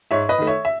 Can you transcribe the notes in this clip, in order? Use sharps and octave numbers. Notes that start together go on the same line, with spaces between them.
G#2 C#5 E5
B4 D#5
D#3 A3
C#5 E5
E5